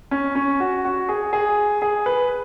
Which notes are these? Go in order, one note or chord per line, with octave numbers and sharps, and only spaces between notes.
C#4
C#4
F#4
F#4
G#4
G#4
G#4
B4